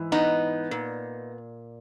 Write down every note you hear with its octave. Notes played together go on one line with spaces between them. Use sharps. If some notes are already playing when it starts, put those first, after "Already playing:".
Already playing: G#2 E3
B3 D#4
A#2